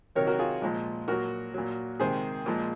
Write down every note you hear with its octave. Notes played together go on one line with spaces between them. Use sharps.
C3 D#3 F#3 A#4 C#5
F#4 A#4
F4 G#4
A#2 F3 G#3
A#2 F#3 F#4 A#4
A#2 F#3
C3 D#3 G#3 G#4 C5
A#2 F3 G#3